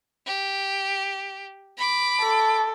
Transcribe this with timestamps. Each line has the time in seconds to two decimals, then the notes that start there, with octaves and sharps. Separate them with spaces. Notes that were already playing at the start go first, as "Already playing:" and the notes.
0.26 G4
1.77 B5 D6
2.21 A4